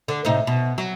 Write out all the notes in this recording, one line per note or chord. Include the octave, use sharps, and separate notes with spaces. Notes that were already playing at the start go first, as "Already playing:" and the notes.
D3
A2 C3 D#4
B2
F#3